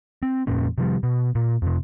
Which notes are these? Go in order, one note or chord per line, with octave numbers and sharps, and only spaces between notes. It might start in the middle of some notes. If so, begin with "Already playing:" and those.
C4
F2 A#2 C#4
C3 F3 G3
B2
A#2
F2 C3